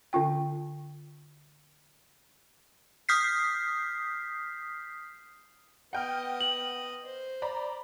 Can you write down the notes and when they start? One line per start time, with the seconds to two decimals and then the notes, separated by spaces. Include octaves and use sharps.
0.13 D3 C#4 F4 G5
3.09 D#6 F6 G6 B6 C7
5.93 B3 D#5 F#5 G5 F6
6.41 F#7
7.05 C5
7.42 D5 A#5 B5